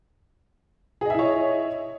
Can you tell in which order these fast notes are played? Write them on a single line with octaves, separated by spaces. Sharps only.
G#4 D#5 E5 E4 C#5